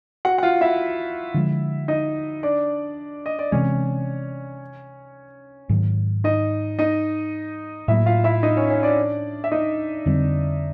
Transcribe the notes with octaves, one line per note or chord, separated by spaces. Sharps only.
F#4 F#5
F#5
F4 F5
E4 E5
D3 F3 G#3
D#4 D#5
D4 D5
D#5
D5
C3 E3 G#3 C#4 C#5
G#2 D#3 F#3
D#4 D#5
D#4 D#5
A2 F#3 A#3 E4 E5
F4 F5
E4 E5
D#4 D#5
C#4 C#5
C#4 C#5
D4 D5
E5
D#4 D#5
F2 D3 G3 C4